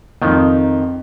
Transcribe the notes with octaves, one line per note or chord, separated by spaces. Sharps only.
F2 D#3